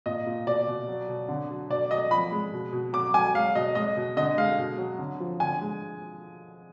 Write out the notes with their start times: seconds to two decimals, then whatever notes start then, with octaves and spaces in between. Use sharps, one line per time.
0.06 A#2 D#5
0.26 A#2
0.47 B2 D5
0.67 B2
0.88 F#3
1.09 B2
1.28 D3
1.50 F#3
1.69 B2 D5
1.91 F#3 D#5
2.11 F3 B5
2.32 G#3
2.52 B2
2.73 B2
2.93 F#3 D6
3.14 F#3 G#5
3.34 G#3 F5
3.55 B2 D#5
3.75 G#3 D#5
3.97 B2
4.17 D3 D#5
4.38 G#3 F5
4.58 B2
4.78 F#3
4.99 D3
5.20 F3
5.40 D3 G#5
5.61 G#3